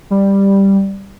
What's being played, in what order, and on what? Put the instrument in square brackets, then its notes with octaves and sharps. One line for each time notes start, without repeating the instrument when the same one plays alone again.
[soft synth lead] G3